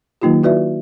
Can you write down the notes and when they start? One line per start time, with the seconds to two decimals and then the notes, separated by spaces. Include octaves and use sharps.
0.22 D#3 F#3 A#3 D#4 F4 G4
0.43 E4 F#4 B4 D5 E5